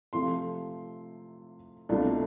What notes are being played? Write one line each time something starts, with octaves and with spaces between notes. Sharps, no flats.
C3 F3 A3 C6
C2 B2 A3 D4 F4